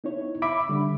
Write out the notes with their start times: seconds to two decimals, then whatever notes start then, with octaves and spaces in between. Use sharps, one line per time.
0.04 B3 D#4 E4 C#5
0.42 E5 B5 D6
0.69 D3 G3